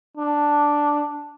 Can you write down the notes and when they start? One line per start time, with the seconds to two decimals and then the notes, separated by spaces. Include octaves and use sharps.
0.17 D4